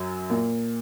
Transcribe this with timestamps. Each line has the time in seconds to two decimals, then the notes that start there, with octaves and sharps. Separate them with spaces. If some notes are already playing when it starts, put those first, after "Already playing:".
Already playing: F#2 F#3
0.30 A#2 A#3